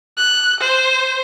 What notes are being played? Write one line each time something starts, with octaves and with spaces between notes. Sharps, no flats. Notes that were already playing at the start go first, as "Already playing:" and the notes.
F#6
C5